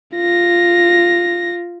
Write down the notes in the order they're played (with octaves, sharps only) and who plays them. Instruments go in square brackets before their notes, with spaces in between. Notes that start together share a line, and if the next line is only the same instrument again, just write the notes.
[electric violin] F4 A#6